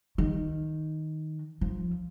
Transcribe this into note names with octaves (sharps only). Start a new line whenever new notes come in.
D#3
F3